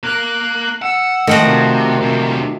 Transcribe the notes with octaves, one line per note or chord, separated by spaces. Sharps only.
A#3 A#4 F#6
F#5 E6
D#3 F3 A3 F#4 A#4
C3
D2 C3